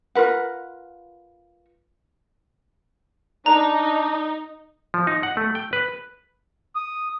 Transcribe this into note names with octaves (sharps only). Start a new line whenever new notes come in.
F4 A#4 B4 F#5
D4 D#4 A#5
F3
D#4
F#5
A3
G5
B4
D#6